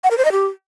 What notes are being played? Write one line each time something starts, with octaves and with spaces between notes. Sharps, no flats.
F#5
A#4
C5
D#5
G4